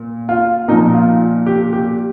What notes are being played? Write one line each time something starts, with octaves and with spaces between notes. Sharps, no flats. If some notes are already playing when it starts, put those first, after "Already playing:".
Already playing: A#2
F4
A#2 F3 D#4
F4
G4
G4